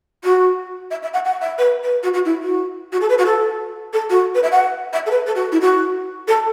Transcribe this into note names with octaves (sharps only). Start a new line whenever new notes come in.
F#4
E5
E5
F#5
F#5
E5
B4
B4
F#4
F#4
E4
F#4
F#4
A4
B4
F#4
A4
A4
F#4
B4
E5
F#5
E5
A4
B4
A4
F#4
E4
F#4
A4